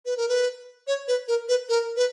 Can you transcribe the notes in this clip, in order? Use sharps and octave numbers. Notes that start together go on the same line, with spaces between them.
B4
A#4
B4
C#5
B4
A#4
B4
A#4
B4